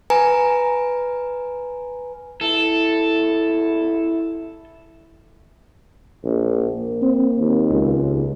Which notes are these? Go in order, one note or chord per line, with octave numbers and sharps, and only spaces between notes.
B4 G#5 A#5
E4 A4
A#1
A#3
C4
D#2
C#2